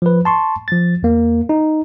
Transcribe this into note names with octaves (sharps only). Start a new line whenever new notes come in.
F3 B4
A5 C6 C#6
F3 A6
E2 A#3
D#4